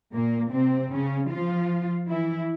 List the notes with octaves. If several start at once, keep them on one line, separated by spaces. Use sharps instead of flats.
A#2 A#3
C3 C4
C#3 C#4
F3 F4
E3 E4